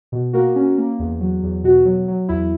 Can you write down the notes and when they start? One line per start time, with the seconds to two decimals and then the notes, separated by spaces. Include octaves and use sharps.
0.12 B2
0.33 A#3 F#4 A#4
0.56 C#4
0.78 A#3
0.99 E2
1.20 F#3
1.43 E2
1.63 B2 F#4
1.85 F#3
2.08 F#3
2.29 E2 E4